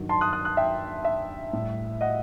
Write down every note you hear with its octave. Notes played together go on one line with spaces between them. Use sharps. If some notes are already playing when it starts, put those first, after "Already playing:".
Already playing: G2 D#3 F#3
A5 C6
D#6 F#6
D#6 F#6
D#6 F#6
E5 G5
E5
A2 G3
D#5 F#5